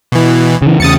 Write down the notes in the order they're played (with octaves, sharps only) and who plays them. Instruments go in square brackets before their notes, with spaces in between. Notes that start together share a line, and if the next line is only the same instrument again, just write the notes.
[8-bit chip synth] B2 E3
[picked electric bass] C#3 E3
[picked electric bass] E2 C#3 [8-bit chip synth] D#6 A6 C#7